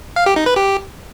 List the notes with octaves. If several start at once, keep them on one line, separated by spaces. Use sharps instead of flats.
F5
G4
D#4
B4
G4